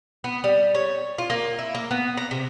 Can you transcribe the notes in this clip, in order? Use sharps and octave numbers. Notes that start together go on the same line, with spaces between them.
B3
G3
C#5
F4
A#3
E4
A#3
B3
A#5
C3